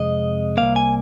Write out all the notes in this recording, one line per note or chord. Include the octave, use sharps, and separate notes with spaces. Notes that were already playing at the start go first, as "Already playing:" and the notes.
Already playing: F2 C3 G#3 D#5
C2 A#2 A#3 F5
G#5